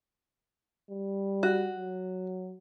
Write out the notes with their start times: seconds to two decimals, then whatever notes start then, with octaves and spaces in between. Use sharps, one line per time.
0.90 G3
1.43 F#4
1.77 F#3